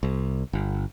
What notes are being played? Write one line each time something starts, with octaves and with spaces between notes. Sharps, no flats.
C2
G1